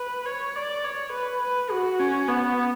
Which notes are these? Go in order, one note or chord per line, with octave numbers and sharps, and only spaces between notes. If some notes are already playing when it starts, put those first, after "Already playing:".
Already playing: B4
C#5
D5
C#5
B4
B4
F#4
C#4
B3